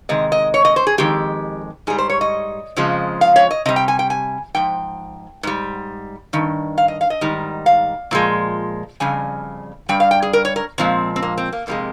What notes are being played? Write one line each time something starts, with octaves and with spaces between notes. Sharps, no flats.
C3 D#3 G#3 D#5
D#5
C#5
D#5
C5
G#4
F2 D#3 G#3 G4
G#2 G3 G#4
C5
C#5
D#5
F2 C#3 F3 G#3
F5
C#5
D#5
C3 G3 D#5
G5
G#5
G5
G#5
G#2 F3 G5
G#2 G3
G2 D#3
F5
D#5
F5
D#5
G#2 D#3 G3
F5
A#2 F3 G#3
F2 C#3 G3 G#5
G2 G3 G5
F5
G5
G#4
A#4
C#5
A#4
A#2 F3 G#3 C4
C4
A#3
C4
A#3
F2 C3 F3 G#3 A#3